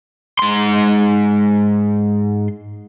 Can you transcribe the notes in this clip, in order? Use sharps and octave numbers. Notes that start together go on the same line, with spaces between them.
G#2 C6